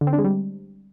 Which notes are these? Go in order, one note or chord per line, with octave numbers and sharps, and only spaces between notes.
D3
C4
D4
G#3
G3